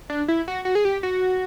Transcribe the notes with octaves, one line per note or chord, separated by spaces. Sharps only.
D4
E4
F#4
F#4
G#4
G4
F#4